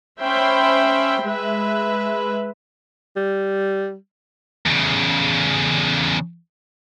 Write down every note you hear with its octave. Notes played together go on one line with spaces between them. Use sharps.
C#4 C5 E5 G5 B5 C6
G#3 B4 E5
G3
E2 C#3